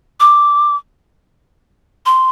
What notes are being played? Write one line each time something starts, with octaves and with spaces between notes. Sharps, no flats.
D6
C6